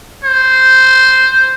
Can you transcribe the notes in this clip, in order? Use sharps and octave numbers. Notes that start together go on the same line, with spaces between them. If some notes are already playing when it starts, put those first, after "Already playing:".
C5